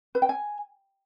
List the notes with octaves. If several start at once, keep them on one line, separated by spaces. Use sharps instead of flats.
B4
G5
G#5